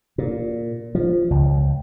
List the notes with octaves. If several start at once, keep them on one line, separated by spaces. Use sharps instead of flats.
A#2
F3
C#2